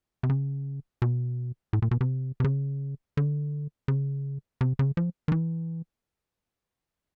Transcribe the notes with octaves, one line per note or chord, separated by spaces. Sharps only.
C3
C#3
B2
A2
A#2
B2
C3
C3
C#3
D3
C#3
C3
C#3
F3
D#3
E3